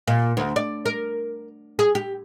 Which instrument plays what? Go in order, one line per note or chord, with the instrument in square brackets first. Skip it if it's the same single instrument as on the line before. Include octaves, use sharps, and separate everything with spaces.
[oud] A#2
D2
D5
A#4
G#4
G4